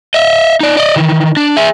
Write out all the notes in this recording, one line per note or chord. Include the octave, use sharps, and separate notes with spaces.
D#5 E5
D#4 D5
D5 D#5
D#3 E3
D4
G#4 E5